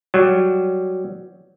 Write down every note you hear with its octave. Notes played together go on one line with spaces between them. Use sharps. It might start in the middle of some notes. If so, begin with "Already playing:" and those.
F#3 G3